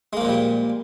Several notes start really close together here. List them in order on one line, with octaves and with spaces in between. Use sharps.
G#3 A#3 F3 A#2 G3